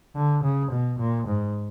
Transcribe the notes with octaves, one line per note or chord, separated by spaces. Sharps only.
D3
C#3
B2
A#2
G#2